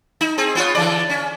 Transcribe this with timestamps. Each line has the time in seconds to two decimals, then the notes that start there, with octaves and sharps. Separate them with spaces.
0.21 D#4
0.38 C4 G#4
0.55 B3 F4 C#5
0.75 D3 E3 D5
1.09 C#4